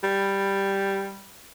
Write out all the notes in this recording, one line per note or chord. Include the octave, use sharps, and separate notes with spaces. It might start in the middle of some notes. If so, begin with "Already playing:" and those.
G3